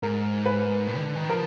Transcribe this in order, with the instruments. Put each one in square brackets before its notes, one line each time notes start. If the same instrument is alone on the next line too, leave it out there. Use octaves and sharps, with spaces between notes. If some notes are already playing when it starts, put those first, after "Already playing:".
[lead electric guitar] G#2 [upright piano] A#4
[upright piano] B4
[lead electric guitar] A2
D#3
D3
D#3
[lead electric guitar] F3 [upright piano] A#4